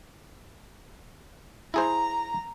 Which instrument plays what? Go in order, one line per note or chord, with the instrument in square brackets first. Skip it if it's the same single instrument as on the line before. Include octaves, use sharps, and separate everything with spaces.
[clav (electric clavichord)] E4 G#4 C5 [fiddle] A#5